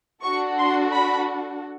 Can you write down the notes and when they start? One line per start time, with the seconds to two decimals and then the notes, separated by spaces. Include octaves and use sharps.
0.23 D4 F#4 A4 C#6
0.58 C6
0.92 B5